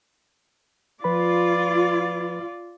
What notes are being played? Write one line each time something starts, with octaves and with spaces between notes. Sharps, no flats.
F3 F4 B4 D5 B5